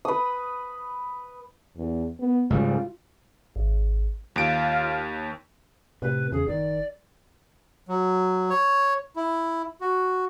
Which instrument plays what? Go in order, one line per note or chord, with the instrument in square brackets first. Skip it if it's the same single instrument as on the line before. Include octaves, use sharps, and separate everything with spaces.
[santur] B4 D#6
[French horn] E2
B3
[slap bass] G#2 C#3 G3 [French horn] F4
[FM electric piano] G#1
[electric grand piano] D#2 D7 [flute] F4
[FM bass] A2 [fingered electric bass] C3 [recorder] B4
[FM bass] E2 [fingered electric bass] C#3 [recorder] G#4
[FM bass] F#1 [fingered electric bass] D#3 [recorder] D5
[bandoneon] F#3
C#5
E4
F#4